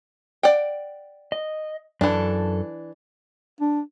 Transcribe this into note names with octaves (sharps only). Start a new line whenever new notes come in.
D5 F#5 G5
D#5
F#2 E3 D4 A4
D4